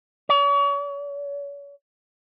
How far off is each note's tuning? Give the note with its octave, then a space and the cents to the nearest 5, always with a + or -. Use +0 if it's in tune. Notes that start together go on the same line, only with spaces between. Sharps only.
C#5 +40